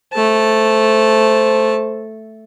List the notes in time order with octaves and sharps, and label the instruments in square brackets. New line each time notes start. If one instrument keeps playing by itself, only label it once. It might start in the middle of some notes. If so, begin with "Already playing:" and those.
[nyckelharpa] A3 A5 [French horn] C5